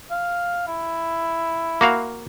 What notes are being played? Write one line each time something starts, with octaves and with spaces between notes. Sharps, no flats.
F5
E4
A#3 F#4 F5